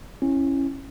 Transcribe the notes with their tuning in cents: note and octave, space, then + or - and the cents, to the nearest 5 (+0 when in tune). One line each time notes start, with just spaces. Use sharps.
C#4 -20 E4 +0